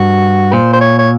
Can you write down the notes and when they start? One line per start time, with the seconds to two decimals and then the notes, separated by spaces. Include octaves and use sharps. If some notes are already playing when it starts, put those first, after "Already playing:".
Already playing: G2 F#4
0.53 A#2 C5
0.73 C5
0.81 C#5
0.99 C#5